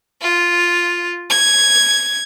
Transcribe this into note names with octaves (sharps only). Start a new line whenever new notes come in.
F4
G#6